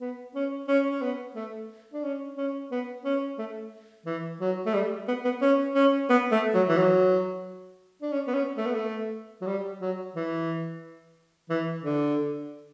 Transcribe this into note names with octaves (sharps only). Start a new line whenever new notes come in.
B3
C#4
C#4
C#4
B3
A3
D4
C#4
C#4
B3
C#4
A3
E3
F#3
A3
G3
B3
B3
C#4
C#4
B3
A3
F#3
E3
F#3
D4
C#4
B3
C#4
A3
B3
A3
F#3
G3
F#3
E3
E3
D3